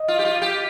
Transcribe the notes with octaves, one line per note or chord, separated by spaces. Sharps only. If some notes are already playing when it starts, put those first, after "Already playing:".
Already playing: D#5
F4
G4
F4
G4